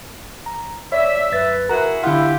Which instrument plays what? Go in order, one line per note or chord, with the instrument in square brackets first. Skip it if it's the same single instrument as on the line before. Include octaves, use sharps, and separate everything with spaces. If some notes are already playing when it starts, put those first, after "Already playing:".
[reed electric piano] A#5
[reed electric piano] C#5 D5 [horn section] E5
[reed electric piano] F#2 A6 [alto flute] B4
[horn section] E4 F#4 G#4 [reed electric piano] A#4 A#5
[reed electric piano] D3 F#5 [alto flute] E4 [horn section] F4 G4